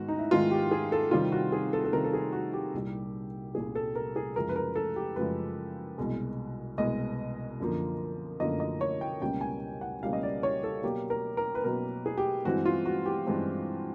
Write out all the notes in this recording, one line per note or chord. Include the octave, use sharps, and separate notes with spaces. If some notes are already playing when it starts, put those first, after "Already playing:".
Already playing: G#2 D#3 G#3 B3 F#4
D#4
E4
G#2 D#3 G#3 B3 F4
G4
G#4
A4
C3 D#3 G3 C4 F4
F#4
G#4
A4
A4
C3 D#3 G3 C4 A#4
A4
G#4
F#4
G4
C2 A#2 G3
C2 A#2 G3 G#4
A4
A#4
G#4
F#2 C#3 F3 G#3 A#4
B4
A#4
A4
G4
F#2 C#3 F3 G#3 B4
C2 B2 G#3
C2 B2 G#3 D#5
F#2 D3 F3 A#3
F#2 D3 F3 A#3 D#5
D#5
C#5
G5
C#2 B2 G3 A#3 C#4 G5
G#5
F#5
C#2 B2 G3 A#3 C#4 F5
D#5
D5
C#5
A4
B2 F#3 A#3 G4
A#4
A#4
B4
B2 F#3 A#3 A#4
G#4
G4
G2 E3 G#3 C4 F#4
F4
F#4
G4
G2 E3 G#3 C4